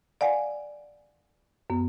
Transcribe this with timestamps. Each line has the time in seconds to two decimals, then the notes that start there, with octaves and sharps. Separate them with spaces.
0.21 D5 F5 F#5 G#5
1.70 F#2 B3